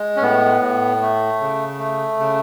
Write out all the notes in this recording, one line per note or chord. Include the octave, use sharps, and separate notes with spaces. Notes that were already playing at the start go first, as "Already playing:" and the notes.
Already playing: G#3
C#4
A2 B3
A2
A3
C#3
A3
C#3